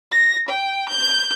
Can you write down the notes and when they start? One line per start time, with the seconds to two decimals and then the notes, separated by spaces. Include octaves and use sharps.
0.12 A#6
0.49 G5
0.89 G6